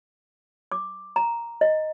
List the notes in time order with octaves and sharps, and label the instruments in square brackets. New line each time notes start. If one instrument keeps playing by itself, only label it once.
[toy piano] D6
A#5
D#5